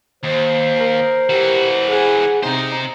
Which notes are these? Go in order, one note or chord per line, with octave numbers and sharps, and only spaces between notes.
D#2 C5
A#4
E3 F#4 G4
G#4 F#5 G#5
C3 C4 D#4 C5